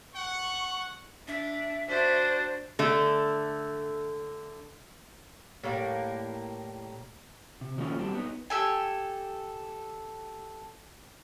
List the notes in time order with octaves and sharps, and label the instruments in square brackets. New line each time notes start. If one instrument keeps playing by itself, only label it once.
[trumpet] F#5 [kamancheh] C#6
[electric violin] D4 [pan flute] E5
[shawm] D4 [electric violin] F#4 C5
[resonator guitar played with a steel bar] D3 A3
[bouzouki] A2 G3 A#3
[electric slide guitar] C3
D#3 F3 A3 A#3 C#4 F4
F#3 G3 C4 D4
B3 D#4
[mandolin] G4 A4 G#5